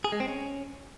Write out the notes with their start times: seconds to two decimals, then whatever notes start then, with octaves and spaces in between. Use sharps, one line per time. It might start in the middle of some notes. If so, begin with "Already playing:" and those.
0.04 G#4
0.12 G#3
0.20 C4
0.28 C#4